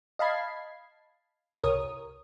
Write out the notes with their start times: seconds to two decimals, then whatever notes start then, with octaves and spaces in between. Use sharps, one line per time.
0.19 D#5 F5 A5 B5 G#6 C7
1.63 C2 A#4 C#5 D#6